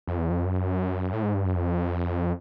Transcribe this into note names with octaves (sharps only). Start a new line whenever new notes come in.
F2
E2
F2
F#2
A2
G#2
G2
F#2
F2